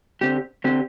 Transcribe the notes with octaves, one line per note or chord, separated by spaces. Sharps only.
D3 C4 G4
D3 C4 G4